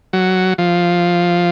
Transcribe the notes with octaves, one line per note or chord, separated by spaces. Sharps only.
F#3
F3